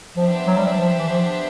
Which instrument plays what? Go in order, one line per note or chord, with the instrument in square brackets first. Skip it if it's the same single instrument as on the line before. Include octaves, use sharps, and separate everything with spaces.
[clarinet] F3 [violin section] B3 D4 G4 C5 E5
[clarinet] F#3
G3
F#3
F3
E3
F3